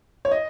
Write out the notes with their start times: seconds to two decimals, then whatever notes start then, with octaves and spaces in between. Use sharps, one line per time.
0.25 C#5
0.32 D#5